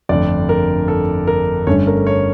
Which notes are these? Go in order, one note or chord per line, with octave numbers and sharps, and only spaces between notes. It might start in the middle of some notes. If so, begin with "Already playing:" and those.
G1 F2 D3 A3 D5
A#4
A4
A#4
G1 G2 D3 A3 C#4 C#5
A#4
C#5